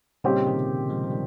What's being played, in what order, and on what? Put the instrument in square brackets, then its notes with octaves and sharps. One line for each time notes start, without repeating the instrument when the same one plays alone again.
[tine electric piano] A#2 C#3 [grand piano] G3 C4 D#4 G4 C#5
[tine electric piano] C3 D#3
F3 G#3
F3
D#3 G3